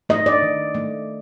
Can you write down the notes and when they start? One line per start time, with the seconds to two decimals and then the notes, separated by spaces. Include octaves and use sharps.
0.09 A3 D#5
0.26 D5
0.42 D#3
0.75 A3